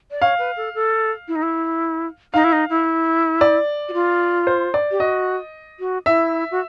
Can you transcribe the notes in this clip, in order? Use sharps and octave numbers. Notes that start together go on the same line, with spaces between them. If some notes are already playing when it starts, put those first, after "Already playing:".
D5
C#5 F5
B4
A4
A4
E4
D#4
E4
D#4 F5
E4
D#4
E4
D5
F#4
F4
C5
D5
G4
F#4 D#5
F#4
E4 E5
F#4